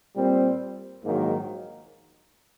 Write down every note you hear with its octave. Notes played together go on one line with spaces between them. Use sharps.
A#2 G3 C4
A#1 G#2 D#3 F#3 A#3